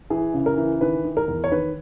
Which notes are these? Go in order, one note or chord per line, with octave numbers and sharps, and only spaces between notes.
E3 G#4
C#3
A#4
E3
D#3 B4
D#3
A#4
E2
C#5
D#3 B4